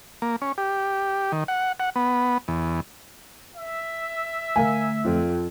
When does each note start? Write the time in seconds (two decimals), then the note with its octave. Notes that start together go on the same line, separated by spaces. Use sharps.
0.22 A#3
0.42 C#4
0.58 G4
1.32 D#3
1.48 F#5
1.80 F#5
1.96 B3
2.48 E2
3.56 E5
4.56 D3 A3 A#4 F5 G#5
5.05 F2 F4